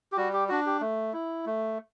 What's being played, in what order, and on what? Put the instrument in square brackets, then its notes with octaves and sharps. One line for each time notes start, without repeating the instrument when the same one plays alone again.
[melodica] G4
G3 F#4
G4
D4 F#4
G4
A3
E4
A3